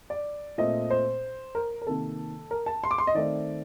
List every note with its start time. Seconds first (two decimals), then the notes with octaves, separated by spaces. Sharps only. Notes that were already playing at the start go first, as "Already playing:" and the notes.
0.10 D5
0.58 A#2 A3 C4 D#5
0.90 C5
1.55 A#4
1.82 A#4
1.86 C3 D#3 A#3 A4
2.51 A#4
2.66 A5
2.84 C6
2.91 D6
2.98 C6
3.07 D#5
3.14 D#3 A3 C4 D5